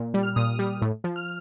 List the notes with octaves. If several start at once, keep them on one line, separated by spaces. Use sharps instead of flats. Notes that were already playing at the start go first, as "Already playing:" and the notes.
Already playing: A#2
G3
F6
A#2 D#6
G3
A2
F3
F6